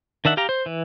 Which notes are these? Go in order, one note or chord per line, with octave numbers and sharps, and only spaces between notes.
D#3 D4 E5 F#5
G4 F5 G5 A#5
C5
E3